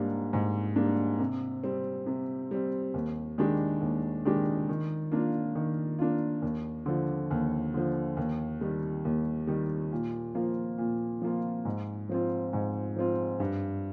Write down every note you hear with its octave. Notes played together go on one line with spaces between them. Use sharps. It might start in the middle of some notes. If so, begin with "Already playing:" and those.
Already playing: G#2 G3 A#3 D4
G#2
G3 A#3 D4
C3
G3 C4
C3
G3 C4
D#2
D#3 G#3 D4 G4
D#2
D#3 G#3 D4 G4
D#3
A#3 D4 F4
D#3
A#3 D4 F4
D#2
D3 F3
D#2
D3 F3
D#2
D#3 G3
D#2
D#3 G3
A#2
F3 A#3 F4
A#2
F3 A#3 F4
G#2
F3 C4 F4
G#2
F3 C4 F4
G2